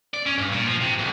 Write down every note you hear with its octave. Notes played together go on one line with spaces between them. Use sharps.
D5
C#4
G2
A#2
F3
C3
B1